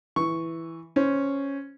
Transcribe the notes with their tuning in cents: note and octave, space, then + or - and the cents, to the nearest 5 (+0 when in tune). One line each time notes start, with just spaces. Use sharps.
E3 +0 C#6 +0
C#4 +0 C5 +0